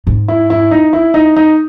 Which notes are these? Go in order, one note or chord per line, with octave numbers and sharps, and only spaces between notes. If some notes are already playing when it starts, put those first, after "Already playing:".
G#2
E4
E4
D#4
E4
D#4
D#4